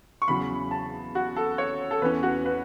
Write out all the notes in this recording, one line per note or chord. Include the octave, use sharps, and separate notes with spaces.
C#6
E2 C#3 F#3 B5
A5
F#4
A4
C#5
A4
E2 E3 C#4 B4
F#4
B4